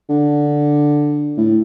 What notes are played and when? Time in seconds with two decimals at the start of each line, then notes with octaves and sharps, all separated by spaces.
0.09 D3
1.37 A2